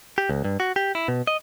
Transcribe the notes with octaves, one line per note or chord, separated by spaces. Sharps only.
G4
C#2
G2
F#4
G4
E4
B2
D#5